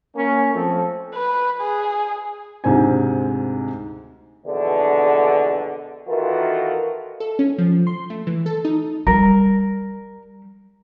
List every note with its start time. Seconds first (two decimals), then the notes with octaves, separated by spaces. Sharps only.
0.16 A#3 C#4
0.54 F3 A3 C4 A4
1.15 B4
1.61 G#4
2.64 D2 G#2 C3 C4 G#5
4.46 A#1 E2 B2 D3
6.08 D#3 E3 F4 F#4 A4 A#4
7.20 A4
7.39 C#4
7.58 F3
7.87 C6
8.10 A3
8.27 E3
8.46 A4
8.65 D#4
9.07 G3 A#4